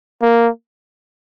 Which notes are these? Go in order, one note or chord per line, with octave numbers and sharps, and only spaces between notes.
A#3